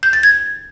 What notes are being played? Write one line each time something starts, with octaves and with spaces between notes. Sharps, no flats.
G6
A6
G#6